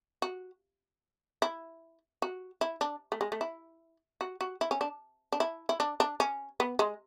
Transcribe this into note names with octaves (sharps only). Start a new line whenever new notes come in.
F#4
E4
F#4
E4
D4
A3
G#3
A3
E4
F#4
F#4
E4
C#4
D4
D4
E4
E4
D4
D4
C#4
B3
G#3